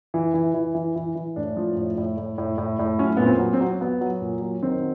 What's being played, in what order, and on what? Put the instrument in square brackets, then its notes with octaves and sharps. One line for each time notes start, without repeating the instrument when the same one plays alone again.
[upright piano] E3
E3
E3
E3
E3
E3
A2 D4
F3
A2
A2
A2
A2
A2
A2
F#3 C#4
A#2 B3
C4
F#3
C4
F#3
F#3 B3
F#3
A#2
F#3
D#3 C4